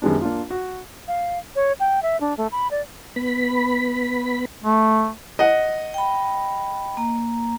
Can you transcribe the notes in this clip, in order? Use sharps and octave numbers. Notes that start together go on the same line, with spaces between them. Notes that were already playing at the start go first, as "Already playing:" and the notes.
F#2 D#3 G3 G#3 B3 D4
A#3 D4 F4
F#4
F5
C#5
G5
E5
D4
A3
B5
D5
B3 B5
A3
D#5 F#5
G5 B5
A#3 A#5